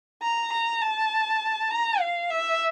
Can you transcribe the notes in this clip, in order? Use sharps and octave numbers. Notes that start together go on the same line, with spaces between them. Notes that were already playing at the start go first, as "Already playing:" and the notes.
A#5
A#5
A5
A#5
F5
E5